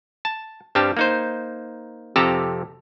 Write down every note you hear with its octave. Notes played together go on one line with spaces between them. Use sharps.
A5
G2 G3 C4 G4 A5
A#3 D#4 C5
F2 C3 G4 A4 A5 A#5